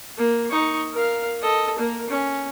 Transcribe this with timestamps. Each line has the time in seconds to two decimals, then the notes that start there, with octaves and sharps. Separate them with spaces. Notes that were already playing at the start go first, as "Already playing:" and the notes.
0.18 A#3
0.50 D#4 C#6
0.93 A#4 F5
1.42 A4 D#5
1.79 A#3 A#4
2.09 C#4